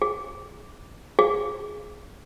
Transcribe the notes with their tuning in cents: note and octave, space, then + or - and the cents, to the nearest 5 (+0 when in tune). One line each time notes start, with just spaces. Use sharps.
G#4 +10
G#4 +5